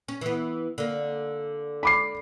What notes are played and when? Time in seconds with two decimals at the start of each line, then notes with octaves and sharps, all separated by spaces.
0.08 C#4
0.21 E3 B3
0.78 D3 A#3
1.83 B5 D6 C7